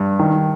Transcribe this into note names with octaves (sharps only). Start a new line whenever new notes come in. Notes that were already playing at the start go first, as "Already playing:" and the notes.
Already playing: G2
D#3